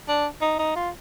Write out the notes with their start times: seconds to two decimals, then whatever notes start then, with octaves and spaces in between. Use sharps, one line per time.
0.09 D4
0.42 D#4
0.59 D#4
0.76 F4